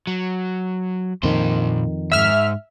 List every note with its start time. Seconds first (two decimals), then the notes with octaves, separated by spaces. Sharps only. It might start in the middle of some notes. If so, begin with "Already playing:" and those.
0.07 F#3
1.23 F2 A#2 D#3 C5
2.12 E2 G#2 E5 F6